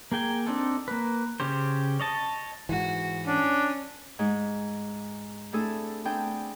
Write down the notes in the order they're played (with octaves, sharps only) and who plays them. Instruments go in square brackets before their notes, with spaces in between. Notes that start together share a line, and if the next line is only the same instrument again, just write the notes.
[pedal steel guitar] A#3 G#4 G5 G#5
C4 D4 D#4 A4
A#3 B4
C#3 C#4 G4 C5
C#5 D#5 A5
[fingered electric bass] G#2 E3 [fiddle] F#4
[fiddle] C#4 [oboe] D4
[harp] G#2 G#3
A3 C4 D4 E4 G#4 A4
B3 C4 D4 G#4 G5